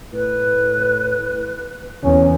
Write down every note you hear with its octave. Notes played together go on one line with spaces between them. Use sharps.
A2 B4
F#1 E2 C#4